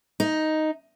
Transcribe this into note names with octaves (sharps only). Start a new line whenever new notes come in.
D#4